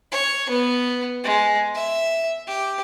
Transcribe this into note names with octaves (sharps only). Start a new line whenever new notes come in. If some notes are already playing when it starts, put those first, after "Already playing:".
C#5
B3
G#3
E5
G4